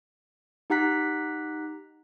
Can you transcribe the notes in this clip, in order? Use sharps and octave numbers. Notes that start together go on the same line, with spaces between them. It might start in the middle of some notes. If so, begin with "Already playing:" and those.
D#4 G4 F#5 A#5 F#6 B6